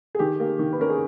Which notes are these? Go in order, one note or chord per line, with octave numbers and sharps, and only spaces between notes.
G#4
D#3 G4
A#3
D#3
B4
C#4 A#4
G#4